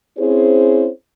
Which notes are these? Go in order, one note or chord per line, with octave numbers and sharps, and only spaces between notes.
C4 C#4 E4 G#4 C5 C#5